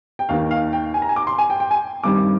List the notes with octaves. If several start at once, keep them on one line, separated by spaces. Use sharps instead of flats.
G5
D#2 D#3 A#3 F5
F5
G5
G#5
A#5
G#5
D6
C6
G#5
G5
G5
G#5
G2 D#3 G3 C4 D6